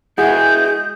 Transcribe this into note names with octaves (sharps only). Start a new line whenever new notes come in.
G#3 E4 F#4 G#4 F#5 G6